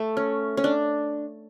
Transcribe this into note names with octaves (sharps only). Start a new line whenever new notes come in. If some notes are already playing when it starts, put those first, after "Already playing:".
Already playing: A3
C#4
C#4
D4